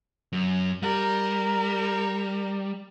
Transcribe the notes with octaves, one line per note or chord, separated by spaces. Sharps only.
F#2
G3 A#4